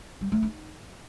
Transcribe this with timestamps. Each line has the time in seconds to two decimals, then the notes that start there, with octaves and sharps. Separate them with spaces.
0.21 G3
0.32 A3
0.43 D#4